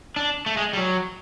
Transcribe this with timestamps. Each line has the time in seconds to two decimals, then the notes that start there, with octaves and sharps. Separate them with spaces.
0.16 D4
0.46 A3
0.57 G#3
0.73 G3
0.77 F#3